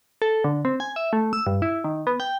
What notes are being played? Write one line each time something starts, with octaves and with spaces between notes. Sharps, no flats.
A4
D3
C4
G#5
E5
A3
E6
G2
E4
D#3
B3
G5